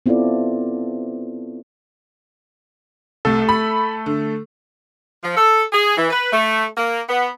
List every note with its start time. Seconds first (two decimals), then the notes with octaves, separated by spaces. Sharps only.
0.06 B3 C4 E4 F4 A4 D5
3.25 C2 A3 A4
3.49 B5
4.06 D3
5.24 F3
5.37 A4
5.73 G#4
5.96 E3
6.11 B4
6.32 A3
6.77 A#3
7.09 B3